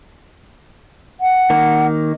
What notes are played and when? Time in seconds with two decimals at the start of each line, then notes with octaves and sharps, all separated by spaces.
1.21 F#5
1.50 D#3 A#3